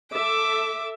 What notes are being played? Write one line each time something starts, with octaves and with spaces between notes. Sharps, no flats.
A4 E5 D6